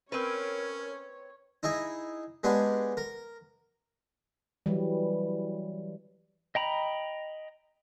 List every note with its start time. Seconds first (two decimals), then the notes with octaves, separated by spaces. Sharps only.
0.12 C4 C#4 A#4 B4 C#5
1.63 D#4 E4 G#4 D#5
2.44 G#3 B3 D4 G4 G#4
2.97 A#4
4.66 E3 F#3 G3
6.55 D#5 G5 A#5 B5